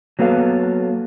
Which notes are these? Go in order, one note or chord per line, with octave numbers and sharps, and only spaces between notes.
F#3 A#3 B3 A4 F5